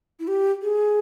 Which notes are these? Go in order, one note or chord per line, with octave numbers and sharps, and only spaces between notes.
E4
G4
G#4